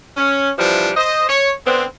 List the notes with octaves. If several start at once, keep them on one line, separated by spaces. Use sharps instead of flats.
C#4
C3 E3 F3 G3 D4
C5 D#5
C#5
D3 B3 C4